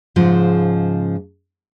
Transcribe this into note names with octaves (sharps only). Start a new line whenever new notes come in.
G#2 C#3 F3 G#3